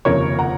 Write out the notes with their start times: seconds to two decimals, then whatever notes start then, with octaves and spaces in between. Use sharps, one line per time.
0.05 F1 D#2 C#3 F3 A#4 C#5
0.39 F#5 A#5